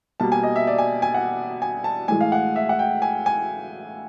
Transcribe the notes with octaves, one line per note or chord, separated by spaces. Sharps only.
B2 G3 A#3 A5
G#5
D#5
E5
D5
G#5
G#5
F#5
G#5
A5
A2 E3 G#3 G#5
F5
F#5
E5
F#5
G5
G#5
G#5